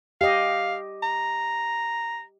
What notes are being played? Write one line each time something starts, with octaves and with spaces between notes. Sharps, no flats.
G4 D#5 F5
A#5